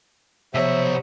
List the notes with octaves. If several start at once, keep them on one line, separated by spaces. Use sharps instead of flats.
B1 C3 F3 B3 C5 C#5 E5